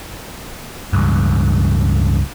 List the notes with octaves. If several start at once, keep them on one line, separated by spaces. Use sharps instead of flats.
C#2 G2